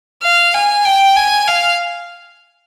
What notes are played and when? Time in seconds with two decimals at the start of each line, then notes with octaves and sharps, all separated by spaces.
0.23 F5
0.54 G#5
0.85 G5
1.16 G#5
1.48 F5